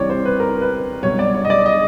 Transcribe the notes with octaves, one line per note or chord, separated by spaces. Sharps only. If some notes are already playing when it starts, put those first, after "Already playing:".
Already playing: C2 C3 E3 C#5 D5
C5
B4
A#4
B4
C2 B2 F#3 C#5
D5
C#5
D#5
D5
D#5